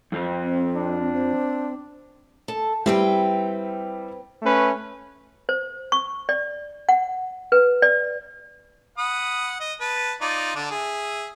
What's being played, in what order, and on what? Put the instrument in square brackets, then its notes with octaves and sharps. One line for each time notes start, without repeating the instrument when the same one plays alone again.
[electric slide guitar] F2 F3
[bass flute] C4
[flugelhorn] D4
[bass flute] C4
[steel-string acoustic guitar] A4
[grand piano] G3 E4 [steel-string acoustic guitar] C4 B4 G5
[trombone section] A3 C#4 B4
[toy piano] C5
C#6
D5
F#5
B4
D5
[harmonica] F#5 B5 D#6
D#5
B4 A5
D#4 F4 D5
D3 D4
G#4 E5